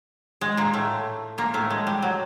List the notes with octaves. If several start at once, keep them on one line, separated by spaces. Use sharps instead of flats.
G#3
A#2 A#3
A2 A3
A#2 A#3
A2 A3
G#3
G3
F#3